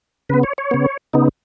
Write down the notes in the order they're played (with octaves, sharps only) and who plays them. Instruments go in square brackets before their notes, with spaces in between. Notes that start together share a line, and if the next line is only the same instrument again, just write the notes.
[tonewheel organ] C#3 B3 B4
C#5
C#5
C#3 B3
C#3 B3 D#4